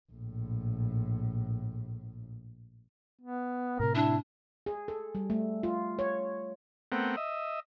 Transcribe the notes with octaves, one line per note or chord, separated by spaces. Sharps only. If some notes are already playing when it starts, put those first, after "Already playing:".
A#1 A2
B3
A2 C3 A#4
D4 E4
G#4
A4
G3
A3
F4
C#5
A3 B3 C4 A#4 F#5 G5
D#5 E5